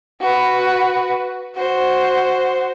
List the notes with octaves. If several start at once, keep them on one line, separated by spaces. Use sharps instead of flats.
F#4 B4
F#4 C5